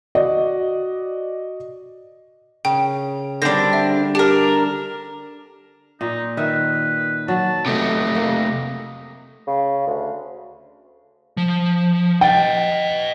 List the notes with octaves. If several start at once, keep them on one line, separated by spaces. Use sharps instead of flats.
F#4 D5 D#5
C#3 G5
D3 G3 C4 D4 A#6
E5
D4 G4 A#4
A#2 D#4
D#3 B4 E5
F#3 F#4 A5
C3 A3 D#5
A#3
C#3
D2
F3
D#5 F#5 G5 A6